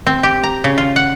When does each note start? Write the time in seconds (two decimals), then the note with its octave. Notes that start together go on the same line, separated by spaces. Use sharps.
0.07 C4
0.23 G4
0.43 A#5
0.64 C#3
0.78 F4
0.96 F#5